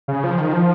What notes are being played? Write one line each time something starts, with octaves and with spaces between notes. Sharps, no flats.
C#3
F3
D#3
F3